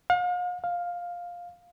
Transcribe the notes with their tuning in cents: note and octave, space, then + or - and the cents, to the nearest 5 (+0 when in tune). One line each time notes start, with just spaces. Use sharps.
F5 +45
F5 +10